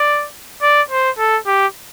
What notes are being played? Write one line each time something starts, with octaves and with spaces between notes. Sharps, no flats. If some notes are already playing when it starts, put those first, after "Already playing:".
Already playing: D5
D5
C5
A4
G4